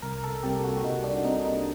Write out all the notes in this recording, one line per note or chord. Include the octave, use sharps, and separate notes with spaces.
C2 A#4
A4
C3 G3 A#3 G4
F#4
F#4
C2 D#4
D4
C3 G3 A#3 D#4
D#4